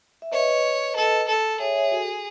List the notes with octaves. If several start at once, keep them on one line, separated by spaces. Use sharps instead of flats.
E5
B4 C#5 D#5
A4
A4
G#4 C#5 E5
C#5 E5
F#4 A4